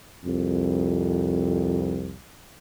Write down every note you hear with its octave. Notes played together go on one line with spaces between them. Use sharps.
C2 F2